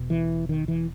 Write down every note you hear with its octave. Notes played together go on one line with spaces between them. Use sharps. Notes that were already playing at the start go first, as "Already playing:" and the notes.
Already playing: E1 B2
E3
D#3
E3